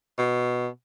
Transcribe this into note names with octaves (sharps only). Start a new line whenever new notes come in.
B2